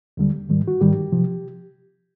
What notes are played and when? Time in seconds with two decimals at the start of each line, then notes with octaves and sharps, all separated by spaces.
0.17 D#2 D3 G3
0.49 G#2 D#3 G3
0.68 F#4
0.80 G#2 D#3 G3 G4
1.12 C3 F3